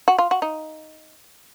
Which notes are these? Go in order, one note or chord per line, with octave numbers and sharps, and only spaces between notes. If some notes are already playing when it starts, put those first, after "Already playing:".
F#4
F4
F#4
D#4